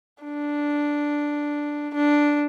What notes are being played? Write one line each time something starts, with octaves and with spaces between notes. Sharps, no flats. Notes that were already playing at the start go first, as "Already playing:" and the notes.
D4
D4